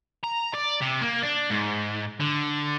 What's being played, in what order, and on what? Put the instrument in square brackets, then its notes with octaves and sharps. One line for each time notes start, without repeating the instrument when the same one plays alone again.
[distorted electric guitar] A#5
D5
C3
A#3
D4
G#2
D3